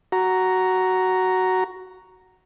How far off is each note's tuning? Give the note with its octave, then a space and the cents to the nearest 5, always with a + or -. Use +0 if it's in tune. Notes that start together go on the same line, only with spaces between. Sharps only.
F#4 +5 A#5 +0